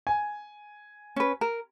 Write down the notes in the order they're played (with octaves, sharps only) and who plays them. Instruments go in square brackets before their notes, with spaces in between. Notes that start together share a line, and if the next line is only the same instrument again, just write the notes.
[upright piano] G#5
[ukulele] C#4 B4
A#4